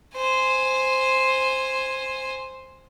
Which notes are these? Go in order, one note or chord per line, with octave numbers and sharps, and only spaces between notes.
C5 G#5